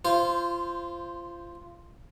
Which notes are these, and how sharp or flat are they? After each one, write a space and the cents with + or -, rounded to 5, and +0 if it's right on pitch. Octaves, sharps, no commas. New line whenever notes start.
F4 -25 C5 +0